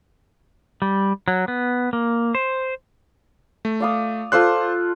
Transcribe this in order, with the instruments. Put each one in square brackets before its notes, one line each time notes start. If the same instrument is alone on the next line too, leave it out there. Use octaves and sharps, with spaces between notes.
[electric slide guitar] G3
F#3
B3
A#3
C5
[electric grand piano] A3
[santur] D5 F5 D#6
[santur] F4 A4 D5 [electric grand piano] C5 C6 F#6